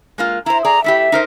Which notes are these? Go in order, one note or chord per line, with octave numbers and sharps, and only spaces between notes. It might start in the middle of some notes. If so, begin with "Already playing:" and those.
G#3 A#3 F4
E4 C5 A#5
G#4 D5 A#5
A3 E4 G4 E5
D#4 A#4 C5